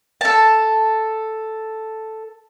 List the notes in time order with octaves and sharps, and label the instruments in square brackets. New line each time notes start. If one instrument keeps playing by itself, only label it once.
[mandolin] A4 A5